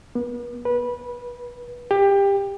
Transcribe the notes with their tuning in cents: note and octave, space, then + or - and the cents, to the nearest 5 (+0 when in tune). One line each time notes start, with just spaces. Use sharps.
B3 -40
B4 -20
G4 +20